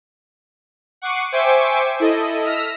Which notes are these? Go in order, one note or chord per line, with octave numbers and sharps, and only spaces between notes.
F#5 C#6 D6 C7 D#7
C5 E5 G5 G#5 C#6 D6
E4 A4 D#5
E6 F6 A#6 B6